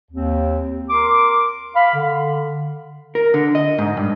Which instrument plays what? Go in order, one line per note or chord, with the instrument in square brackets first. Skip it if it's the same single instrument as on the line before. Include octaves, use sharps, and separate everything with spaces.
[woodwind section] D#2 C4
A#4 C6 D6
F5 B5
D3
[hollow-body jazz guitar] A#4
D3
D#5
G#2
G2